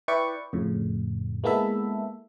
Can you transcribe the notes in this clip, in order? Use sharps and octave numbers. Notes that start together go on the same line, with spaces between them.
E4 B4 D5 G5 C#6
F2 A2 C#3
G#3 A#3 B3 E4 A4 E5